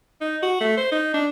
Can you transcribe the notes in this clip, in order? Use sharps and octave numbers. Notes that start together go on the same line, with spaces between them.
D#4
F#4
A3
C5
D#4
D4